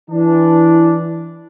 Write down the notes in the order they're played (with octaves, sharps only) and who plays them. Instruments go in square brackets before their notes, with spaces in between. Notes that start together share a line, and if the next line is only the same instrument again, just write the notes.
[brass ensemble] E3 D4